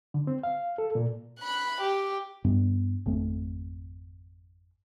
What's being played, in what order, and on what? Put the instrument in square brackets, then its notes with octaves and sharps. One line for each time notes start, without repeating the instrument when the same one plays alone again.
[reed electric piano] D3
C4
F5
A4
A#2
[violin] B5 F#6
G4
[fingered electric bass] G2 B3
G#1 F2 A3 C4